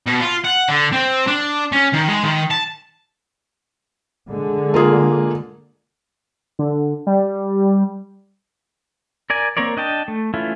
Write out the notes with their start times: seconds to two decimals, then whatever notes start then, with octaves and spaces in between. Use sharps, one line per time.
0.07 B2
0.20 F4
0.44 F#5
0.68 D3
0.93 C4
1.27 D4
1.72 C#4
1.93 D#3
2.08 G#3
2.23 D#3
2.50 A5
4.29 D3 G#3
4.74 A#3 F4 G#4
6.59 D3
7.07 G3
9.30 A#4 D5 G#5
9.57 A#3 C4 A#4 C#5 D5
9.77 D4 D#5 G5 A5
10.08 A3
10.34 E3 A3 C#4 E4 F4